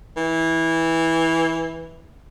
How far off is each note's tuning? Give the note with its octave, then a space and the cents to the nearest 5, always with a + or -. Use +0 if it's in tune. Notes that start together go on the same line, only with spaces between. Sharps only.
E3 -15